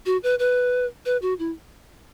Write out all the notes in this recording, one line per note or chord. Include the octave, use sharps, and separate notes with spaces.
F#4
B4
B4
B4
F#4
E4